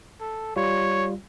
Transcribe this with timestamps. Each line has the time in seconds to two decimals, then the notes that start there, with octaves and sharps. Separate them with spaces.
0.21 A4
0.57 G3 F4 C#5